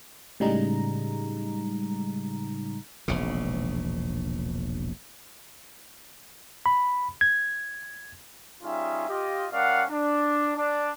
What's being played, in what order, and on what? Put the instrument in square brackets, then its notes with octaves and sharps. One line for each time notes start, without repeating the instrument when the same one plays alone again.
[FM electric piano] A2 C#3 G3 G#3 D#4 A#5
[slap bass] E1 A#1 C#3
[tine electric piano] B5
G#6
[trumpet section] G3 C#4 D#4 F4 G#4 E5
F4 G4 D#5
G3 C#4 A#4 D5 F5 F#5
D4
D4